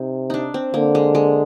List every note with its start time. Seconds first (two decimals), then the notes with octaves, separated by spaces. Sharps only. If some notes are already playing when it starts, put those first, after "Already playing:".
Already playing: C3 D#4
0.30 D4 D#4
0.54 C4
0.74 D3 A#3
0.95 G#3
1.15 G#3